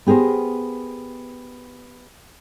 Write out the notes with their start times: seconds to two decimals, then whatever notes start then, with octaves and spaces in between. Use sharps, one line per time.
0.06 B3 G4 G#4 A#4 C5